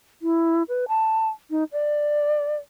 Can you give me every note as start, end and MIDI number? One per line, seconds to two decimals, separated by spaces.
0.22 0.63 64
0.68 0.85 71
0.88 1.28 81
1.50 1.64 63
1.72 2.56 74